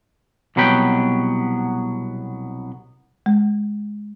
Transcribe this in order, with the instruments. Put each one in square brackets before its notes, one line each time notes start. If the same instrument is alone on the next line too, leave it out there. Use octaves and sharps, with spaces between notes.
[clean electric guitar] C2 B2 F#3 B3 B4 G5
[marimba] G#3